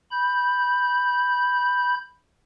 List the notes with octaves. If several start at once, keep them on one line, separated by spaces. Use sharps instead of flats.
B5 G6